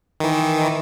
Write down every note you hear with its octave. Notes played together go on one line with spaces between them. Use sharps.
D#3 E3